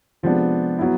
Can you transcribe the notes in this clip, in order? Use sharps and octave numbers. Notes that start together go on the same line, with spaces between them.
C3 F3 G#3 B3 D4
F#3 B3 E4